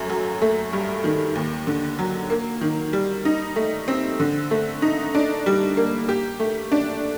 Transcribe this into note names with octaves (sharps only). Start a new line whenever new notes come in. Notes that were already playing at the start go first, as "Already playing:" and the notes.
Already playing: F#2 A3
F#3
A3
G2
D#3
D#2
D3
F#3
A#3
D#3
G3
D#4
A3
C4
D3
A3
D#4
D4
G3
A#3
G4
A3
D4